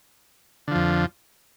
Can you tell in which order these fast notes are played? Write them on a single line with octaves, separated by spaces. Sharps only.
D3 F3 F2